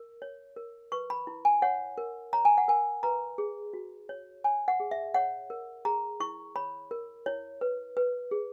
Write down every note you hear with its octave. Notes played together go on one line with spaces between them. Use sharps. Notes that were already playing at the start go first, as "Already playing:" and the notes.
Already playing: A#4
C#5
A#4
B4 C#6
B5
E4
G#5
C#5 F#5
A#4
C#5 A#5
G#5
F#5
A#4 G#5
B4 A#5
G#4
F#4
C#5
C#5 G#5
F#5
G#4
E5
C#5 F#5
A#4
G#4 A#5
E4 C#6
C#5 B5
A#4
E4 C#5
B4
B4
G#4